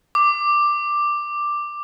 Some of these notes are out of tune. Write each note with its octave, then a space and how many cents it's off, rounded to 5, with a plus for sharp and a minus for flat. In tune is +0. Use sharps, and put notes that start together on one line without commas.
D6 +5